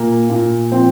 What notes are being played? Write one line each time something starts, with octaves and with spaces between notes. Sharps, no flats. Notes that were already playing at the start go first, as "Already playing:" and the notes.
Already playing: A#2 A#3 A#4
A#2
F3 C4 C5